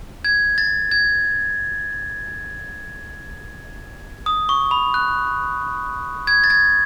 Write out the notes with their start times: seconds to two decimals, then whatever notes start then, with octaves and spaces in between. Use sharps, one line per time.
0.25 G#6
0.58 A6
0.91 G#6
4.26 D#6
4.49 C#6
4.71 B5
4.94 F#6
6.27 G#6
6.44 A6
6.50 G#6